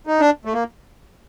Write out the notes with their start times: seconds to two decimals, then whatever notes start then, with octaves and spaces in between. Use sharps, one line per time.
0.07 D#4
0.20 D4
0.45 A3
0.54 A#3